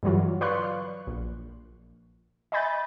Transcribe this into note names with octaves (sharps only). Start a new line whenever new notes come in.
G2 D3 E3 F#3 F4
B4 D5 F5 C6 C#6 F#6
A#1
D#5 E5 G#5 B5 G6 A6